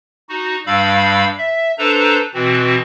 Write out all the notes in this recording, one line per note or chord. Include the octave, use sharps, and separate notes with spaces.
D#4 F#4
G2 G3 F5 B5 E6
E5
D4 A4 B4 C5 A#5
B2 E3 C4 F#4